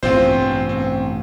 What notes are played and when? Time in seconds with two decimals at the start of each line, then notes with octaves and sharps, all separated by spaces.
0.03 A1 G2 B2 C4 F4 C5
0.69 C4